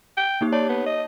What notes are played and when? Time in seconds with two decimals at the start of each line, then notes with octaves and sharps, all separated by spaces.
0.17 G5
0.41 A#3 D#4 G4
0.52 C#5 D5 A5
0.69 B3
0.87 D#5